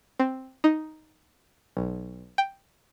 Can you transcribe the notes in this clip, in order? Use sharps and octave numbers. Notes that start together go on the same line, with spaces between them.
C4
D#4
B1
G5